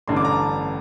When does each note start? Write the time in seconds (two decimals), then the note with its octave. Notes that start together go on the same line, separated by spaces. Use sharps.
0.08 A1 G2 D3 C6
0.16 D6
0.25 A#5
0.33 A5